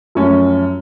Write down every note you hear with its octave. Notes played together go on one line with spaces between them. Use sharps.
F#2 F3 A3 C#4